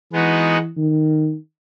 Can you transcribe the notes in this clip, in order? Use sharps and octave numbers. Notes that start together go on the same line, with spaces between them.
E3 G#3 B3 D#4 F#4 B4
D#3